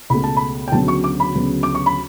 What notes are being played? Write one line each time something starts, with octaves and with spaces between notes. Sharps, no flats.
C#2 B2 A3 B5
A5
B5
G5
D2 C#3 F#3 B3 A5
C#6
D6
B5
D2 C#3 F#3 B3
D6
C#6
B5